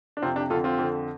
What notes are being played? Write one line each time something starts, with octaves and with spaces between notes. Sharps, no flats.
D4
F2 C3 C4 F4
D4 G4
F2 D3 F4 A4
C4 F4
F2 D3